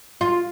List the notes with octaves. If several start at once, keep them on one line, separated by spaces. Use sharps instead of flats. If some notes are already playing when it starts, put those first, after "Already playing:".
F4